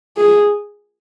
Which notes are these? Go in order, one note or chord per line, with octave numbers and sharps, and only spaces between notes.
G#4